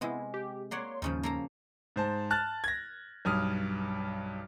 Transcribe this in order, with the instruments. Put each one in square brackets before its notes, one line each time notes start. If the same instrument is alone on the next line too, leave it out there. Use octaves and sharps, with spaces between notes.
[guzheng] C3 G#3 [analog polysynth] B3 E4
[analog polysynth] G4
[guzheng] A#3 D5 F#5 [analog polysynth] C#5 C6
[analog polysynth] D#2 [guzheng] G#2 C#3 F3
[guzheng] A#3 A4 A#5
[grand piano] G#2 C5 A5
A5 F6 F#6 A6
G#6 A#6
B1 G2 D#6 F6